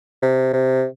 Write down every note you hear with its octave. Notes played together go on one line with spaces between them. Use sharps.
C3
C3